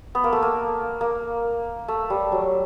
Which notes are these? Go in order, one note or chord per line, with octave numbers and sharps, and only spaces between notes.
B3
A#3
A3
A#3
A#3
A3
G3
F#3